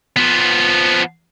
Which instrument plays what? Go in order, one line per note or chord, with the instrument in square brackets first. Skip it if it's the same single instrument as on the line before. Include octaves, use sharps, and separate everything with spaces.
[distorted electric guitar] F3 B3